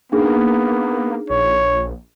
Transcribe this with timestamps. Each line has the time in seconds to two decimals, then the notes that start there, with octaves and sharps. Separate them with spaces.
0.12 A#3 B3 D4 D#4 G#4
1.30 A#1 C#5